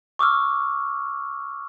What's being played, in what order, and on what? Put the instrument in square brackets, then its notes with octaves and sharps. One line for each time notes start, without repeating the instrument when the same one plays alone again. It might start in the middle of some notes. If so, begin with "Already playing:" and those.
[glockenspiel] C#6 D6 E6 F6